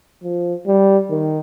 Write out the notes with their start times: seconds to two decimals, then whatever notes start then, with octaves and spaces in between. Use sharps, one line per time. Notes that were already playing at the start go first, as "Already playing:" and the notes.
0.23 F3
0.67 G3
1.11 D#3